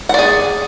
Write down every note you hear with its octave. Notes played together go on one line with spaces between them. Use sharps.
G#4 D5 F#5